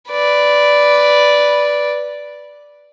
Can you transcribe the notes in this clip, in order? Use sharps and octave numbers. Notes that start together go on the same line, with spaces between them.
B4 D5